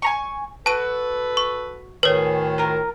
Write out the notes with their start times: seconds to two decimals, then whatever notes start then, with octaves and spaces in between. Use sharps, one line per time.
0.02 G#5 A#5 C#6
0.66 F#4 A4 B4 A5 D#7
1.37 C#6
2.03 D2 A2 D#3 G#4 B4 C#5
2.58 F4 A#4